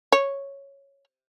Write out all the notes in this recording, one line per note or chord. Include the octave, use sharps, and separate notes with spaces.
C#5